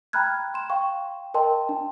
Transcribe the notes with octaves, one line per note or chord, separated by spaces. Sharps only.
G5 A#5 B5 F6 F#6 G#6
C6 E7
F5 G5 C#6
A#4 D#5 G5 A5 C6
D4